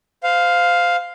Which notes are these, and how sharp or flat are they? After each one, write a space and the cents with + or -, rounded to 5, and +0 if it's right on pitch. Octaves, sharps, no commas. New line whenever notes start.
C5 -25 F5 +5